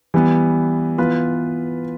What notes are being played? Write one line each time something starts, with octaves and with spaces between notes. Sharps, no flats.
E3 G3 B3
E3 B3 F4 B4